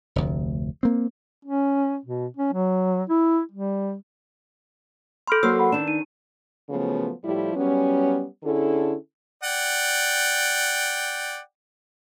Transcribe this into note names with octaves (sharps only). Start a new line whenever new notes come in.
F1 D2
A#3 C4
C#4
B2
C#4
F#3
E4
G3
A4 B5 C6 F6 G6
F#3 A#3 C5 E6
F#5 B5
D#3 D4 E7
D#4 D#7
C#3 F3 F#3 A3 B3
A2 F3 G3 E4 G4
F#3 G3 B3 C#4
D3 C#4 E4 G#4 A4
D5 F#5 G5